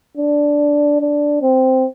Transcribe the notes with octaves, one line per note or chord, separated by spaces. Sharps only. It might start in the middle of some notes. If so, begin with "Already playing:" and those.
D4
D4
C4